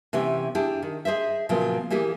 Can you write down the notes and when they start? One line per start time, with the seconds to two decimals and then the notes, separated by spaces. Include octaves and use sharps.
0.13 C3 E3 B3 C#4 G4
0.55 D4 E4 G4 G#4
0.83 D#3
1.05 G#4 C5 D#5 E5
1.49 A#2 C#3 F3 F#3 A#3 B3
1.90 E3 A#3 E4 G4 G#4